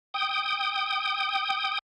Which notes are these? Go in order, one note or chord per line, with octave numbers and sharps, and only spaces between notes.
G5 D#6